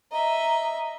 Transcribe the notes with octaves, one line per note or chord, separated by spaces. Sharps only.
D#5 E5 A#5